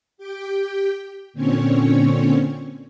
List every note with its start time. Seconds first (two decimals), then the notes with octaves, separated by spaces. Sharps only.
0.18 G4 G5
1.33 A#2 D3 C4 C#4 C#5